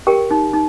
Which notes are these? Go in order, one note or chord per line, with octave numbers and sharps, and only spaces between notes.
G4 A#4 G5
D#4
D#4